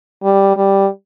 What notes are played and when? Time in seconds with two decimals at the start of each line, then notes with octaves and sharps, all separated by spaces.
0.23 G3
0.56 G3